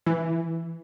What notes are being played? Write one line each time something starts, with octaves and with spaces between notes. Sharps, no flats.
E3